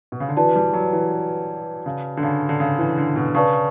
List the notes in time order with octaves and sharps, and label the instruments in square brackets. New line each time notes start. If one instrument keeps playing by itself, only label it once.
[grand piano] B2
C#3
D3
[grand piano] E3 [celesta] F#4 B4 D5 A5
[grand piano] G3
F#3
E3
C#3
D3
C#3
D3
C#3
E3
D3
B2
[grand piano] C#3 [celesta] B4 D5 A5 C#6